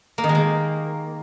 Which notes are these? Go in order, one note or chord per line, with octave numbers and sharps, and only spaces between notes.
A#3
D#3
G#3
A#3